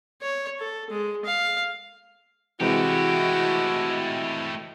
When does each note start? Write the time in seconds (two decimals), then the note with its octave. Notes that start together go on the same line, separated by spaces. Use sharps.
0.22 C#5
0.59 A4
0.90 G#3
1.25 F5
2.60 C3 E3 G#3 A3 E4 F#4 G4 D#5